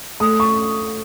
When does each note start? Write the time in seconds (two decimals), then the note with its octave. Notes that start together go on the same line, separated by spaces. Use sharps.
0.20 A3 D#6
0.40 C#6